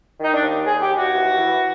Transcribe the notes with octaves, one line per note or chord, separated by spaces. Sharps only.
D#3 D#4
D4
D#2
D#2 G#4
G4
D#2
F#4
E3
E3